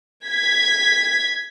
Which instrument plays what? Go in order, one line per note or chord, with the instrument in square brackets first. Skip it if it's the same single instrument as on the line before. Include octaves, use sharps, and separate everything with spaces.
[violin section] G#6 B6